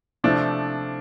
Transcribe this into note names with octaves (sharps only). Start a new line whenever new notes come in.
C3 F3 A3 D4